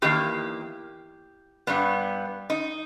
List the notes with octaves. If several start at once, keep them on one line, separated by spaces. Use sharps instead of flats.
E2 D#3 A#3 G4
G2 G3 B3
D#4